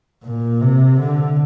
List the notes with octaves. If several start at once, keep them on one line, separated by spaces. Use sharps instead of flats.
A#2
C3
D3